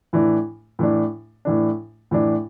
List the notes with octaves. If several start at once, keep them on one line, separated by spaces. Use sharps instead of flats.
A2 E3 D4
A2 E3 D4
A2 E3 D4
A2 E3 D4